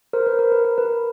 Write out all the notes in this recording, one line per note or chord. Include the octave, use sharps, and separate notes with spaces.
A#4 C5
B4
A#4
B4
A#4
B4